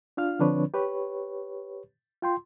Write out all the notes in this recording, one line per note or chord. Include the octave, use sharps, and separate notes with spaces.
D4 F4 F5 F6
D3 F3 C4 D4 B4 C#5
G4 B4 C#5
F4 G5 C6